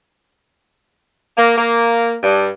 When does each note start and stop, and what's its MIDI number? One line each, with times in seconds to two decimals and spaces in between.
1.37 1.56 58
1.57 2.14 58
2.23 2.48 43